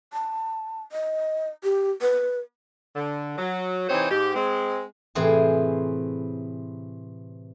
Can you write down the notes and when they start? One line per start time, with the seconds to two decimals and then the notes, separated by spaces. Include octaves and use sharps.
0.13 A5
0.92 D#5
1.64 G4
2.01 B4
2.96 D3
3.38 F#3
3.89 C3 E3 C4 D#4 C5 C#5
4.10 G#2 G4
4.34 G#3 C4
5.15 A2 C3 E3 G#4 C5 G#5